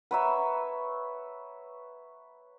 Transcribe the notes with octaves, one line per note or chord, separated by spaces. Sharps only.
B4 C#5 E5 F#5 A#5 B5